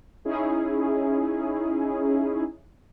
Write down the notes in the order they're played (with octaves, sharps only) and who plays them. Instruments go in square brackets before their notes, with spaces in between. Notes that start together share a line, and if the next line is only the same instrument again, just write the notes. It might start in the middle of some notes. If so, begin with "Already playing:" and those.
[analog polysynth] C#4 D#4 E4 G#4